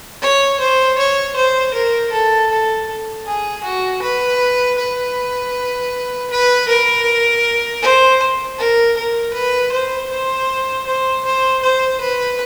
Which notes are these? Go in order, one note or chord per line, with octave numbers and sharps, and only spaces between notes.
C#5
C5
C#5
C5
A#4
A4
A4
G#4
F#4
B4
B4
B4
A#4
C5
A#4
A#4
B4
C5
C5
C5
C5
C5
B4